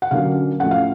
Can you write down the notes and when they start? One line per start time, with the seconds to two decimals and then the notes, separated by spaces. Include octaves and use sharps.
0.02 F#5
0.11 D3 F#3 A#3 C#4 F5
0.59 A2 F3 A3 C#4 F#5
0.71 F5